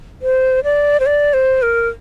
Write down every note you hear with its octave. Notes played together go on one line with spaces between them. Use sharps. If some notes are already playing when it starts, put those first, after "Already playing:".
C5
D5
C5
D5
C5
A#4